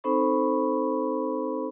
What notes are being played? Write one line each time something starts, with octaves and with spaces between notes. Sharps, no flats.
C4 D#4 A4 C5 B5 C#6